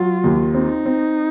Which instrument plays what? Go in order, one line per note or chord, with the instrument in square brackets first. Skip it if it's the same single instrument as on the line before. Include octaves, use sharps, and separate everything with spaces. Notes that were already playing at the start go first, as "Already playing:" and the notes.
Already playing: [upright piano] F#3 [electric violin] F4
[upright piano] D#2
[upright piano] C4 [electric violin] D#4
[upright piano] C4